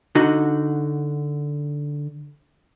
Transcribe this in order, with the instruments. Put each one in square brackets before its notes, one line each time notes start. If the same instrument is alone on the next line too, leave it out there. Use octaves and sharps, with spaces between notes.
[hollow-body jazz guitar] D3 D#4 F#4